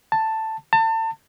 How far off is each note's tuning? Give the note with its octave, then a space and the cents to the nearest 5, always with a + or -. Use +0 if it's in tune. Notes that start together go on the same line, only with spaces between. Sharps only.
A5 +5
A5 +30